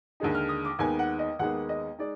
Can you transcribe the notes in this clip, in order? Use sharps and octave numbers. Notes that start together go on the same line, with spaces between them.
D#2 D3 G#3 D#4
F6
D#6
D6
D#2 D#3 G#3 B3 D#4 G#5
F#5
D#5
D#2 D#3 G#3 B3 D#4 F#5
D#5
G#3 D#4 D5